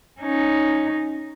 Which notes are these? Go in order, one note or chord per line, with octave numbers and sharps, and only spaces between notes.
C#4 D#4